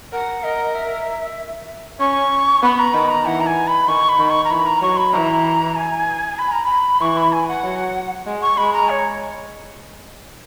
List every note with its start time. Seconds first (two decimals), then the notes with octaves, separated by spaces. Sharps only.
0.12 A#4 F#5
0.44 A#4 D#5
0.75 E5
2.00 C#4 C#6
2.63 B3 B5
2.79 A#5
2.94 D#3 B5
3.10 A#5
3.25 E3 F#5
3.40 A#5
3.47 G#5
3.67 B5
3.88 D#3 C#6
4.09 B5
4.19 D#3
4.30 C#6
4.44 A#5
4.50 E3 B5
4.66 A#5
4.82 F#3 C#6
4.97 B5
5.13 E3 A#5
5.76 G#5
6.38 B5
6.51 A#5
6.64 B5
7.01 E3 C#6
7.17 B5
7.32 G#5
7.48 F#5
7.64 F#3
8.26 G#3
8.42 C#6
8.57 G#3 B5
8.73 A#5
8.89 C#5